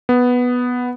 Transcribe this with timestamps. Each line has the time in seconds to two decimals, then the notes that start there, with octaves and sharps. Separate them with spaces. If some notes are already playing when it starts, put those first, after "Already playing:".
0.09 B3